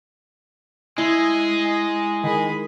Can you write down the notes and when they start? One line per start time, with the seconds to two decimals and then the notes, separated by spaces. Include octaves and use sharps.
0.98 G#3 E4 G#5
1.68 D#5
2.24 D#3 G#4 B5